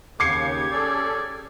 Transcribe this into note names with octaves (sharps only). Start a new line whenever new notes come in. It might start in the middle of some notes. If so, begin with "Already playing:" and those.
D#2 C#3 G4 D6 G#6 C7 C#7
C#4 G#4 A4 D5